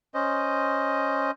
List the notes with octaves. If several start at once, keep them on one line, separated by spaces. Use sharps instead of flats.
C#4 C5 D#5